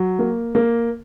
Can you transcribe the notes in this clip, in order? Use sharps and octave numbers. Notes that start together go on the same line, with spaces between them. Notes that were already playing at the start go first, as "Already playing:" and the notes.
Already playing: F#3
A#3
A#3